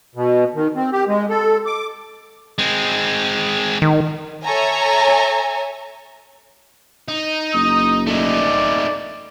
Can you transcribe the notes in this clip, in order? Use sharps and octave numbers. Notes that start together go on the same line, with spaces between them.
B2
D#3
C4
G4
G#3
A4
D6
G#3 C4
D#3
A4 C#5 E5 G#5 A#5
D#4
F#1 D#6
A3 D#4 D5